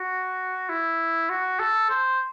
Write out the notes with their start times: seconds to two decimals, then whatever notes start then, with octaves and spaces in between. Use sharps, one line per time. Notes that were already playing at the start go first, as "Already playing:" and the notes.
Already playing: F#4
0.69 E4
1.30 F#4
1.60 A4
1.90 C5